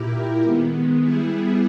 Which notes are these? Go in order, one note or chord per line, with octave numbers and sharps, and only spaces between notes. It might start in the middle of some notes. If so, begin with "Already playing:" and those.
Already playing: A#2 A#3 E4 G4 A#4
D#3 G#3 B3
G3 B3 E4 G#4